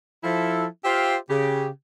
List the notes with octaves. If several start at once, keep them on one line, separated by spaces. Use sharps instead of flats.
F3 E4 A4
F4 G4 C5 E5 F5 G5
C#3 G4